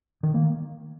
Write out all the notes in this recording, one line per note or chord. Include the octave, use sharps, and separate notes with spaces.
D#3
A#3